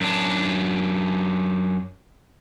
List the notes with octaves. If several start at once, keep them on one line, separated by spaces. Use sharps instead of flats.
F#2 D4